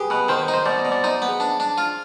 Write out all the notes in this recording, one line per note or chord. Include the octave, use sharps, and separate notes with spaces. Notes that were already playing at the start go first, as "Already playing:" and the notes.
Already playing: G4 G#4 B4
B2 B4
D#3 C5
C5
D#4
C5
B2 D5
D#5
B2
D5
D#4 C5
B3
G#4
D4
D4
F4